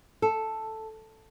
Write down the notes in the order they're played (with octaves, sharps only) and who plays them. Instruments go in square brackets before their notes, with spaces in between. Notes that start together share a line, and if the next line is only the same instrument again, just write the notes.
[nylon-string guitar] A4